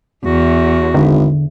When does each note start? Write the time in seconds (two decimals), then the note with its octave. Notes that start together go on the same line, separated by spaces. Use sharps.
0.25 E2 F#4
0.94 G#1 D3